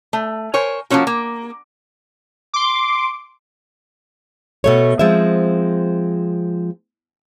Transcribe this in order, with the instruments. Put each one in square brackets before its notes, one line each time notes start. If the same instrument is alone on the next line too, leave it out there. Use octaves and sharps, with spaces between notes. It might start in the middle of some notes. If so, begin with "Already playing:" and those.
[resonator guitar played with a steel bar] A3
A#4 C5 C#5 G#5
F3 F#3 A#3 C#4 F#4
A#3
[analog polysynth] C6 D6
[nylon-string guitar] B2 A3 C#5
F3 G#3 C4 E5